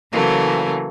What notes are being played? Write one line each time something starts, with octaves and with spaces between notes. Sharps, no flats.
C#3 E3 F#3 A3 A#3